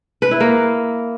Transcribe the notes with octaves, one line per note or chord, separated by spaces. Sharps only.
B4
E4
A#3